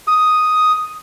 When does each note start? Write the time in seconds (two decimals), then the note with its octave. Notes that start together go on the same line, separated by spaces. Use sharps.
0.07 D#6